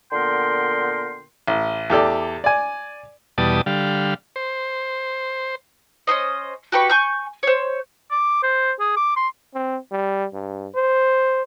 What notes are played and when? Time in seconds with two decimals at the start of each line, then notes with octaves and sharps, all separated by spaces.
0.12 A#2 D3 B3 A#4 G5 C6
1.48 A1
1.90 E2 G4 A4 D5
2.44 D5 G#5
3.38 E2 B2 G3 D5 A5 D#6
3.66 D3 G3 F5
4.36 C5
6.07 C#4 D4 C5 D#5
6.72 F#4 G4 B4 C#6
6.90 G#5 C#6 G6
7.43 C5 C#5
8.11 D6
8.43 C5
8.80 G#4
8.97 D6
9.16 C6
9.54 C4
9.92 G3
10.34 G2
10.75 C5